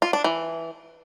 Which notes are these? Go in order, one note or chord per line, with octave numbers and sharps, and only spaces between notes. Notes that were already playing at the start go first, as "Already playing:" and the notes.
F4
D4
E3